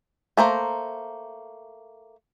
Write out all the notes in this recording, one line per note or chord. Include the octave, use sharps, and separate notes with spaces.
A3 A#3 C5 A#5